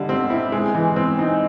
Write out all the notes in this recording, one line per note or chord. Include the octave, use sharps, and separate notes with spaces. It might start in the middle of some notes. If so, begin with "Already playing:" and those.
Already playing: D3 G3 D#4
C4
E4
G#3
E3
C4
D#4